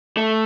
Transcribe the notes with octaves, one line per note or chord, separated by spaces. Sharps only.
A3